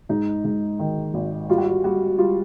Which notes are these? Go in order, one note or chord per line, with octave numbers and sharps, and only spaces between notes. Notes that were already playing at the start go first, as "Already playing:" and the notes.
G#2 D#4
G#2
D#3
G#1
G3 F4
F#4
F4
G3 F#4
G3 F4